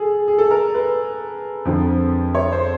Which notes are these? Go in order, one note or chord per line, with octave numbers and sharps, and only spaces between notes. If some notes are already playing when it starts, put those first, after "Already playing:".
Already playing: G#4 A4
G#4
A4
A#4
B4
F2 D3 F3
C#5
C5